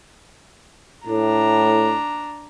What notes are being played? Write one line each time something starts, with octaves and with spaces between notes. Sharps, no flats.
A2 D4 A#5